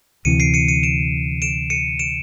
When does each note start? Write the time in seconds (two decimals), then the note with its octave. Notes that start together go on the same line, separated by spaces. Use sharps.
0.25 D2 C3 E3 C#7 D#7
0.40 C7 D7
0.54 C#7 D#7
0.68 C#7 D#7
0.83 D7 E7
1.42 D7 E7
1.70 C#7 D#7
1.99 D7 E7